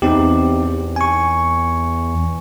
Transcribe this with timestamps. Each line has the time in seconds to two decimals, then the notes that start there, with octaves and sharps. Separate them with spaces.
0.02 E2 C4 D#4 G4
0.96 G#5 C#6